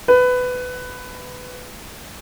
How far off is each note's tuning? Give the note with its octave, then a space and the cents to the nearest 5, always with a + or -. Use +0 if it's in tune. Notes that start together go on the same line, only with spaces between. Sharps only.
B4 +15